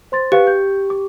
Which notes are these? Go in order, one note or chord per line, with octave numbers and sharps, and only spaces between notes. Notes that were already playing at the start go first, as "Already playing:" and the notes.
C5 C6 A6
G4 B4 F5 F#6
G6
D6